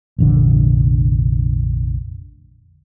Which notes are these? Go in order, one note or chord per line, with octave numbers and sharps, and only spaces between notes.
F1 A#1 D3